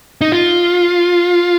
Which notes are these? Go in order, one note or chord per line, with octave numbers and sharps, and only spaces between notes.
D#4
F4